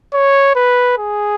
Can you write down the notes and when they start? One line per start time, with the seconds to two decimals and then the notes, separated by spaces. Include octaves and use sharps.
0.13 C#5
0.55 B4
0.98 G#4